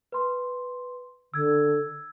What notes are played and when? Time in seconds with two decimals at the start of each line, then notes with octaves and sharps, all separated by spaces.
0.12 B4 C6
1.34 D3 E6 G#6